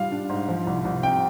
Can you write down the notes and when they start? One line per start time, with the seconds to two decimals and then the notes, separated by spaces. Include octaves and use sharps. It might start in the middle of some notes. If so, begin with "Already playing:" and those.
Already playing: G#2 G3 F4 F5
0.11 D4
0.30 G#2
0.48 F3
0.67 C2
0.85 C2
1.03 C3 G5